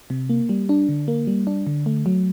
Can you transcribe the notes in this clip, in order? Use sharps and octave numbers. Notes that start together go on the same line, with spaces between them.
C3
A#3
G3
D4
D3
A#3
G3
D4
D3
A3
F#3